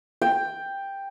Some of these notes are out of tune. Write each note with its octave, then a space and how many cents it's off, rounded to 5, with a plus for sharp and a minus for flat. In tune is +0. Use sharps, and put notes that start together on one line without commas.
G5 +5